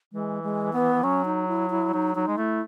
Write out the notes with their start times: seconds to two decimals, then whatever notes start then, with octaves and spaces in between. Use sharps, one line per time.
0.13 E3 G#3
0.43 G#3
0.73 B3
1.03 F#3 C#4
1.25 D#4
1.48 E4
1.70 E4
1.93 F#3 D#4
2.15 F#3 D#4
2.27 G#3
2.38 A3 E4